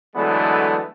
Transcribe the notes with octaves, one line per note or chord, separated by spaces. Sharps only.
D3 E3 F#3 G#3 A3 B3